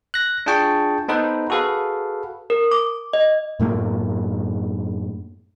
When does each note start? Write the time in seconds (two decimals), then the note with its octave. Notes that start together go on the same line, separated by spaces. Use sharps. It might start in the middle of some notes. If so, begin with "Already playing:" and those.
0.14 F#6 A#6
0.46 D4 F4 G#4 G5 A5 C#6
1.08 B3 D#4 A4 B4 C5
1.50 F#4 G#4 A4 B4 F5
2.50 A#4
2.71 D6
3.13 D#5
3.60 F#2 A2 A3 A#3